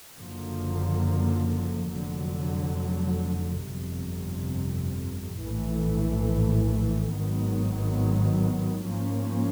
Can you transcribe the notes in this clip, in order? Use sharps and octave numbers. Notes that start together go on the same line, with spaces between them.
F#1 F#2 D3 F3 A#3
F1 F2 D3 F#3
G1 F2 C3
A#1 A2 E3 A3
G#1 G#2 D#3 F#3 B3
G#2 F3 A#3 C#4